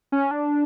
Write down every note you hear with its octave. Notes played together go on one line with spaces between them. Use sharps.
C#4
D4